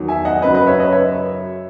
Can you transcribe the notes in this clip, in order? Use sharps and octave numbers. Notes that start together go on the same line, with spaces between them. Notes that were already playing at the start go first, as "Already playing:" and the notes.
Already playing: E2 D#3 F#3
E5 G#5
D#5 F#5
F#2 C#3 F#3 B4 D#5
B4 D#5
C#5 E5
B4 D#5
C#5 E5